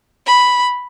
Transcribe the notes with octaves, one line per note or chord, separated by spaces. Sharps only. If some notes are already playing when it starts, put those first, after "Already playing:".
B5